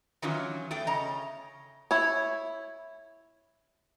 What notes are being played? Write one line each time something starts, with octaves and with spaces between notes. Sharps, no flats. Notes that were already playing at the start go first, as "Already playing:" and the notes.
D#3 E3 F#3 C#4 F4
E2 A3 G5
C#3 C#4 D#5 A#5
E4 C#5